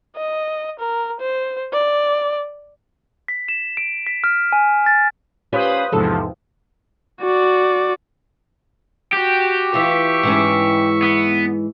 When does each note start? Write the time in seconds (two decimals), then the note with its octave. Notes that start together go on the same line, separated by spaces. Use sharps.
0.16 D#5
0.79 A#4
1.20 C5
1.73 D5
3.28 B6
3.48 E7
3.77 D7
4.07 B6
4.24 F6
4.52 G#5
4.86 A6
5.53 C#4 F4 G4 B4 C5 D#6
5.92 E2 G#2 C3 F3 A4
7.21 F#4 D5
9.13 F#4 G4
9.74 E3 F4 E5 C#6
10.23 G#2 E3 C#4
11.02 B3